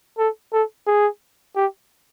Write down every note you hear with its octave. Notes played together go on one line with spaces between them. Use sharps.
A4
A4
G#4
G4